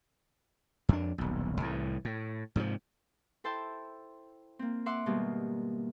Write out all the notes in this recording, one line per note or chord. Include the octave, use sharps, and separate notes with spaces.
F2 D4
D#1 B1
C2 A2 E3
A2
G#2 C3 E3 F3
E4 A4 C5 G5 A5 C6
A#3 C4
E5 F#5 C6 D6
G#2 B2 D#3 G3 A#3